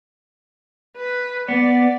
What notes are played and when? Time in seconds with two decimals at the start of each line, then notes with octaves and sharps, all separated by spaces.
0.97 B4
1.49 B3 D5